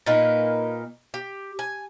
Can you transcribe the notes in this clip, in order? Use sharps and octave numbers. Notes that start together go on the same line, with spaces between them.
A#2 A#3 D#4 B4
G4
G#5